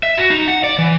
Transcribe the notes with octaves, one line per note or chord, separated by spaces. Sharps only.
E5
F#4
D#4
F#5
D5
E3